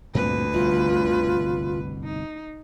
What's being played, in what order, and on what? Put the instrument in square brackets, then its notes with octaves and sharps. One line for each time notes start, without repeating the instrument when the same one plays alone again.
[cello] D2 B4 [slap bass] G2 A#2 C4
[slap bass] G1 C2 B2 [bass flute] F4
[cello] D#4